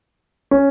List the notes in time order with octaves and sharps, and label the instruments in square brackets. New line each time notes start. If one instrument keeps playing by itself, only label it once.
[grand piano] C#4